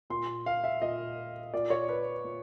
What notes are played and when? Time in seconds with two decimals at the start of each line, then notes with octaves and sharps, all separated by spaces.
0.10 A#2 C6
0.46 F5
0.64 E5
0.82 A#2 D#5
1.53 A#2 D5
1.70 C#5
1.89 B4
2.24 A#2